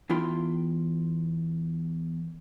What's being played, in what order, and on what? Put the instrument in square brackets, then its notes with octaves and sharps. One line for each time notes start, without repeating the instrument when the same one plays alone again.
[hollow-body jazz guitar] E2 E4 F4 G5 C6